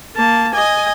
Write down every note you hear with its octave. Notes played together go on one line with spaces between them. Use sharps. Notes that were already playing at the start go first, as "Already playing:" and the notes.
A#3 A5
D#5 G#5